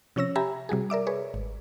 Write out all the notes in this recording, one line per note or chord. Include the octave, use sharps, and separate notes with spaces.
C3 F3 C#4 C#5 E6 A#6
G4 E5 G#5 A#5 B5
C3 G3 F#4 G#4
A#4 D5 E5 D6
G#4 B4 C#5
G#1